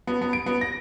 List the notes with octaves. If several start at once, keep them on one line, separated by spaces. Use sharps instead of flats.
B3
B3
D7
B3
A#6